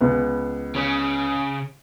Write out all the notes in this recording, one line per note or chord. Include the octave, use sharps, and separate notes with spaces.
C#2 B3
C#3 C#4